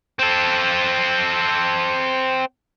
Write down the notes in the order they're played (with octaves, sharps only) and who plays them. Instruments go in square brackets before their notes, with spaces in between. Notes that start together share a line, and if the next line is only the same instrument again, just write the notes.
[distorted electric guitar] C4 A4